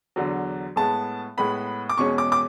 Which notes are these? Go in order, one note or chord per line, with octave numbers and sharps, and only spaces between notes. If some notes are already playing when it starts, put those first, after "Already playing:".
E2 D3 F#3
A2 G#3 B3 A5
A2 G#3 B3 B5
D6
E2 B2 G#3 C#4 C#6
D6
D6